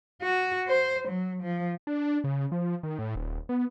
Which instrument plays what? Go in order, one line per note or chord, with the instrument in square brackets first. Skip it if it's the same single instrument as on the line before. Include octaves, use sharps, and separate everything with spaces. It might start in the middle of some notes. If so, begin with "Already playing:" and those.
[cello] F#4
C5
F#3
F3
[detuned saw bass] D4
C#3
F3
D#3
A2
D#1
B3